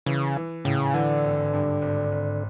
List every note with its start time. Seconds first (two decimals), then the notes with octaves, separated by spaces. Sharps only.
0.06 C#3 E3
0.36 E3
0.65 A2 C#3
0.94 D3 E3
1.24 G#1
1.53 G2
1.82 G#1
2.12 G#1